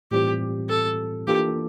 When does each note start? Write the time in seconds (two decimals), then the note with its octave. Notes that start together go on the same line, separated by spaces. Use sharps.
0.11 A2 E3 G3 C4 F4 G4
0.69 A4
1.28 E3 A#3 D4 F4 G4 A4